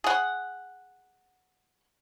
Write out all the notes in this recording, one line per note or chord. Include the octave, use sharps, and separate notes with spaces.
G#4 F#5